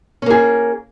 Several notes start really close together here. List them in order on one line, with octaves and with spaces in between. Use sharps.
C#4 A#3 G#4